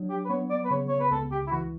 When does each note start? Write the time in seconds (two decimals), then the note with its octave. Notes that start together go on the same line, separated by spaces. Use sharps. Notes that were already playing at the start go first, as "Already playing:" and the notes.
Already playing: F#3 D4
0.10 G4
0.25 B4
0.29 B3 C#5
0.50 D5
0.65 B4
0.70 C#3 C#5
0.88 C#5
1.00 B4
1.11 C#2 A4
1.31 G4
1.47 E4
1.51 E3 F#4